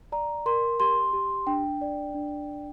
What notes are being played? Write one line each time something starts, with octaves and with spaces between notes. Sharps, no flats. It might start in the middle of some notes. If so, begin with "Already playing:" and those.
D5 A#5
A#4 C6
G4 C6
G4
D4 G5
D5
D4